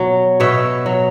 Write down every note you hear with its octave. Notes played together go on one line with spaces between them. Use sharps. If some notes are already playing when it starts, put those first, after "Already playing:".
Already playing: B2 F#3
B2 C#5 E5
F#3